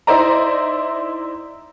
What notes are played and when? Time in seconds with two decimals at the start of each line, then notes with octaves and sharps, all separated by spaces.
0.07 D#4 E4 C5 D5 A#5